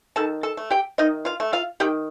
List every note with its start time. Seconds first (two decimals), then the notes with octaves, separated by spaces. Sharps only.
0.16 D#3 A4 A5
0.43 A4 A5
0.57 A3
0.70 G4 G5
0.98 D#3 D#4 D#5
1.25 F4 F5
1.40 A3
1.53 F4 F5
1.80 D#3 G4 G5